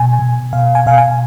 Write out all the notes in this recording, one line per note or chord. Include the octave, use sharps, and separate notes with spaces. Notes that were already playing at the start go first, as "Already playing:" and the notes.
Already playing: B2 G#5
B2
B2 F5
G#5
B2 F5
G#5